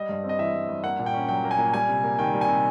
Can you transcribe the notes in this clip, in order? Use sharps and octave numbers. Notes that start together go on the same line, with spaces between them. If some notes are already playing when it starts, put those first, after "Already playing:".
Already playing: G3 D#5
G2
C4
D#5
E3 E5
G3
G2
A#3 F#5
A#2
G5
C#4
F#3 G5
A#3
G#5
A#2
G3 G#5
C3
A#3
D#3 G5
G3
G#5
C3